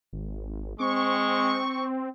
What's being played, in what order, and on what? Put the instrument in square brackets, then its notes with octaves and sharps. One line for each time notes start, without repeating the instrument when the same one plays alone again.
[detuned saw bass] G#1
[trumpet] G#3 [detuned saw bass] C4 [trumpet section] C#6